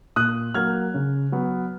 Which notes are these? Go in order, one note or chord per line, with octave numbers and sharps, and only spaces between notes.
A#2 D#6 F#6
F#3 A#3 F6 G#6
C#3
F#3 B3